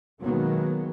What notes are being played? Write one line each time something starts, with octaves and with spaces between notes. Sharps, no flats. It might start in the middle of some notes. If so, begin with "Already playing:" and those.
B2 D#3 F#3 G#3 A#3 B3